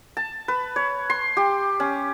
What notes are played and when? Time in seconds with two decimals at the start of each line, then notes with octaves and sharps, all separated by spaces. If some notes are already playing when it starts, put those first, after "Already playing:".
0.17 A5
0.48 B4
0.76 C#5
1.10 C6
1.37 G4
1.80 C#4